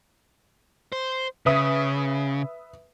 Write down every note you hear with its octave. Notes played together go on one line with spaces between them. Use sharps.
C5
C#3 B4 E5 D#6